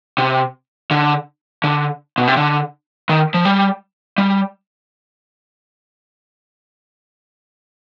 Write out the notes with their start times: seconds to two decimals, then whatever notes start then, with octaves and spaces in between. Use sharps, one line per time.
0.18 C3
0.91 D3
1.64 D3
2.18 B2
2.27 C3
2.37 D3
3.09 D#3
3.34 F3
3.45 G3
4.18 G3